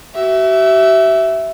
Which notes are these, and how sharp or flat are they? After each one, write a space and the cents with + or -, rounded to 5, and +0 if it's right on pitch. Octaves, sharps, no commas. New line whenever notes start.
F#4 +45 E5 +0